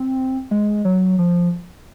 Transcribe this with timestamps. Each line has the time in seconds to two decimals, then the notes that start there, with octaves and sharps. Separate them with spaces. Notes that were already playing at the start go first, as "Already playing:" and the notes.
Already playing: C4
0.51 G#3
0.85 F#3
1.18 F3